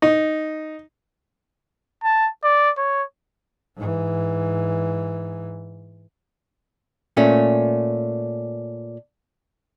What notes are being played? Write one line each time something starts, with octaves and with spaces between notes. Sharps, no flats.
D#4
A5
D5
C#5
G#2 E3
A#2 A3 C#4